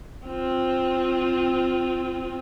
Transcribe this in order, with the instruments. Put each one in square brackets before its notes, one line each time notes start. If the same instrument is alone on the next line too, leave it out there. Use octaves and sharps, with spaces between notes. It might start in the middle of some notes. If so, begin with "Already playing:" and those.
[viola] C4 F4